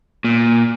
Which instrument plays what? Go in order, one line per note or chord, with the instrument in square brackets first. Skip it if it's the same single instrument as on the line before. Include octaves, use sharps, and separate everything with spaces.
[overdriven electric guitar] A#2